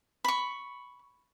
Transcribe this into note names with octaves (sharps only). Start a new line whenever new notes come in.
B5 C#6